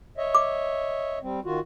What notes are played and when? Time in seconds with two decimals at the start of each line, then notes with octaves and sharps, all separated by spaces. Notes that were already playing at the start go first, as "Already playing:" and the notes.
0.17 C#5 D#5 E5
0.35 D6
1.23 G3 C4
1.45 D#3 F4 F#4